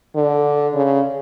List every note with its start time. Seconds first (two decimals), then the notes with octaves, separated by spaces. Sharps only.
0.15 D3
0.74 C#3